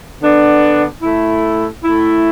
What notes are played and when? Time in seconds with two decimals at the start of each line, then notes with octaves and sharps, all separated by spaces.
0.20 D3 B3 D4
1.01 A2 A3 E4
1.83 A2 A3 E4